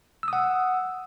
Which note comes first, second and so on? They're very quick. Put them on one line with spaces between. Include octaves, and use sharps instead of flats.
E6 D#6 F#5